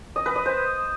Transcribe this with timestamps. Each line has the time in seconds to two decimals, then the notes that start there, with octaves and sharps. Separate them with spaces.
0.16 D#5
0.26 B4
0.36 D#5
0.46 C5